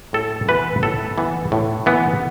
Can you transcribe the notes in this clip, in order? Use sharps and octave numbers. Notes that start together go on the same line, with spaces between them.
A2 A4
E3 B3 B4
A2 A4
E3 B3
A2
E3 B3